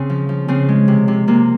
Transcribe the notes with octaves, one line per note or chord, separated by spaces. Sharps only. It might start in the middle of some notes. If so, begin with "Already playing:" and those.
Already playing: C#3 C4
F3
F3
C#3 C4
G#3
C3
C3
C3 A#3